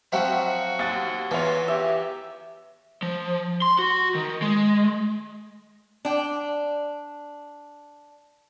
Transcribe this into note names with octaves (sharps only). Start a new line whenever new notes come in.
F3 F#3 C4 F#4 E5 F#5
D#2 A6
E2 E3 F4 C#5
G4 E5
F3
C6
F#4
D#3
G#3
D4 G5